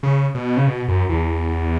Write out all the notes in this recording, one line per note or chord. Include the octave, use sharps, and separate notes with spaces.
C#3
B2
C#3
B2
F#2
E2